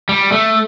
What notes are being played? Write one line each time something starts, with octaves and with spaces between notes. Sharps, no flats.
G3
A3